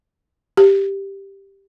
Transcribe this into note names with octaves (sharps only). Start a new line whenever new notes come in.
G4